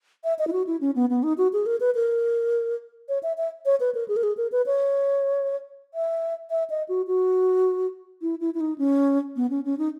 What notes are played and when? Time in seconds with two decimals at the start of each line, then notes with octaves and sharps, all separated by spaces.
0.24 E5
0.39 D#5
0.47 E4
0.53 F#4
0.67 E4
0.81 C#4
0.96 B3
1.10 B3
1.23 D#4
1.38 F#4
1.53 G#4
1.66 A#4
1.80 B4
1.95 A#4
3.09 C#5
3.23 E5
3.38 E5
3.66 C#5
3.80 B4
3.95 A#4
4.08 G#4
4.16 A#4
4.23 G#4
4.37 A#4
4.52 B4
4.66 C#5
5.94 E5
6.50 E5
6.70 D#5
6.89 F#4
7.07 F#4
8.22 E4
8.41 E4
8.54 E4
8.60 D#4
8.78 C#4
9.36 B3
9.50 C#4
9.65 C#4
9.78 D#4